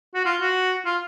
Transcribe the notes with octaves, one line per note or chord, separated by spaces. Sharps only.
F#4
F4
F#4
F4